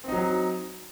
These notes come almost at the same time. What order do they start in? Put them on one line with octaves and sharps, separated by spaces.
C4 D#4 F#3